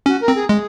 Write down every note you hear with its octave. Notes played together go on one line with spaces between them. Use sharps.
C#4 F#4
A#4
C4
G#4
G#3 G#4